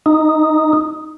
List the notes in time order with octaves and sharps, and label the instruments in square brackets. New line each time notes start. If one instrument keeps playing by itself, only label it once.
[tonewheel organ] D#4